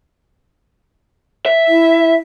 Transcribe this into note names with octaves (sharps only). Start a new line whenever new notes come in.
E5
E4